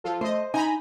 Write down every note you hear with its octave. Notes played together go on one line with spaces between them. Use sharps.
F3 F4 A4
A3 C5 D#5
D#4 G#5 A#5 B5